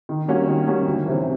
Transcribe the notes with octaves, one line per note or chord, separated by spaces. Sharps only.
D#3
G3 A#3 C#4 F#4
D#3
G3 A#3 C#4 F#4
D2
C3 E3